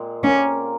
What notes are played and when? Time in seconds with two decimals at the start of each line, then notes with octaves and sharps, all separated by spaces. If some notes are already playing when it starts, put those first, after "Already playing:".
Already playing: A#2 G#3 C4
0.23 A#3 C#4 F4 A#4